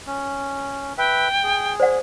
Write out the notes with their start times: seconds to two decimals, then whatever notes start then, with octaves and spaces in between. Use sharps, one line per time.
0.07 C#4
0.98 B4 E5 G5
1.43 G#4
1.80 C5 D5 F#5